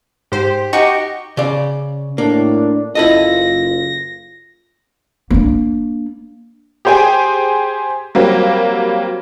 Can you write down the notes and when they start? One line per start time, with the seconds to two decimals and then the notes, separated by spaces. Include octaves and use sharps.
0.32 G#2 G4 C5
0.73 D#4 F#4 G4 D#5 C#6
1.37 C#3 D5
2.18 A2 A#3 D4
2.95 F#1 E4 F4 A4 D#5 A#6
5.30 A#3 D4
6.85 G4 G#4 C5 G5 G#5
8.15 F#3 G3 A#3 C4